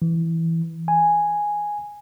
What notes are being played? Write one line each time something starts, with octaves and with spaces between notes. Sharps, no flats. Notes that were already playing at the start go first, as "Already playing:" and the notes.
E3
G#5